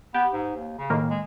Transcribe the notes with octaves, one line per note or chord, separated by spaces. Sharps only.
B3 G4
G#2
D#2
C#3
A2 D#3 A#3
G#3